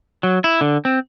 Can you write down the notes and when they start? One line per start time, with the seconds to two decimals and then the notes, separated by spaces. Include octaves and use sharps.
0.23 F#3
0.44 E4
0.61 D3
0.85 C4